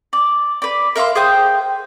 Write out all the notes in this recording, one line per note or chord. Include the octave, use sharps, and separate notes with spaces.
D5
B4 D5
A#4 E5 F5 C6
G#4 C5 G5 D#6